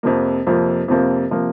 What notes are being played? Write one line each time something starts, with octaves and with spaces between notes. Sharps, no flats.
F2 C3 F3 A#3
F2 C3 F3 A#3
F2 C3 F3 A#3
C3 F3 A#3